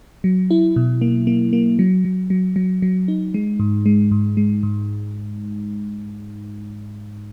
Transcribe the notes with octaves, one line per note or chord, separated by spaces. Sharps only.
F#3
E4
B2
A#3
A#3
A#3
F#3
F#3
F#3
F#3
F#3
D#4
G#3
G#2
G#3
G#2
G#3
G#2